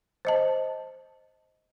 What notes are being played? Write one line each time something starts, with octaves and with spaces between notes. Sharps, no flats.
C5 D#5 A5